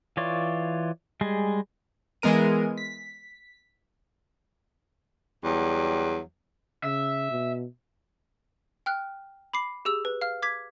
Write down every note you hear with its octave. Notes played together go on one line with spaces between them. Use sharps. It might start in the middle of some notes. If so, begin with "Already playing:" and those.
E3 F4 C#5 D5
G3 G#3 G#4
E3 G#3 B3 A#4 D#7
B6
E2 F#3 G3
C#3 E5
B2
G5 F6 F#6
B5 D6 C7
G4 G#4 E6
B4
F5 F6
D6 G#6 B6